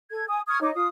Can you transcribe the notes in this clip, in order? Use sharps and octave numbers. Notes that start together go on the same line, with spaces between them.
A4 G#6
G#5 D#6
C#6 D#6 F6 G#6
D#4 C#5 D#5 D6
F4 D#6